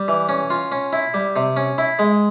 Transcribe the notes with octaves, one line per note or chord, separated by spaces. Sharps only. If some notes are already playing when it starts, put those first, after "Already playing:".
Already playing: G3
E3
C#4
F4
C#4
E4
G3
C3
C#4
E4
G#3